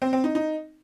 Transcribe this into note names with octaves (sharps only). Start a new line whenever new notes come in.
C4
C4
D#4
D#4